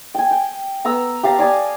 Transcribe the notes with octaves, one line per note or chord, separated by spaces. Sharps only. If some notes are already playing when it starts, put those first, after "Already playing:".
G5 G#5
G5
B3 A#5 E6
G4 F5 A5 A#5
D5 G#5 A5 D#6